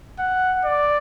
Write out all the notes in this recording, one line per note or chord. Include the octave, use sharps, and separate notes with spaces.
F#5
D5